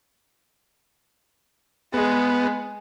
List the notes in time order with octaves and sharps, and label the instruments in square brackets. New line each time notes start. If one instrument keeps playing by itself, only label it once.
[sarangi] G#3 [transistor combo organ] B3